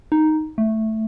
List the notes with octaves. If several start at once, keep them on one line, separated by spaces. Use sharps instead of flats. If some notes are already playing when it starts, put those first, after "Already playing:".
D#4
A3